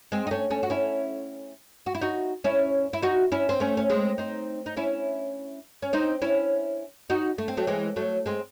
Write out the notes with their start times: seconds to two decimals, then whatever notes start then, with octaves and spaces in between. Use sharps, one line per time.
0.12 G#3 C4
0.27 D#4
0.31 A3 C#4
0.50 A3 C#4
0.63 F#4
0.70 C#4 E4
1.86 F#4
1.95 E4
2.01 D#4 F#4
2.44 C#4 E4
2.93 E4
3.02 D#4 F#4
3.32 C#4 E4
3.49 C4
3.60 A3 C#4
3.77 C#4
3.90 G#3 C4
4.18 C4 D#4
4.66 D#4
4.77 C#4 E4
5.82 C#4
5.93 C4 D#4
6.22 C#4 E4
7.10 D#4 F#4
7.38 A3
7.48 C4
7.57 F#3 A3
7.67 E3 G#3
7.96 F#3 A3
8.26 G#3 C4